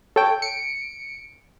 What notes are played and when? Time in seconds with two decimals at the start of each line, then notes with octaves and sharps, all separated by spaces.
0.16 A4 C#5 G5
0.42 C#7 D7